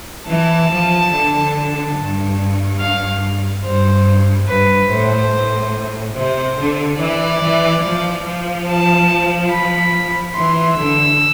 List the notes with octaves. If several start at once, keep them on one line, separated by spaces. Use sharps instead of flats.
E3 A5
F3
D3
G2
F5
G2 C5
G2 B4
A2 C5
A2
C3 C5
D3
E3 D5
E3
F3
F3
A5
B5
E3 C6
D3 E6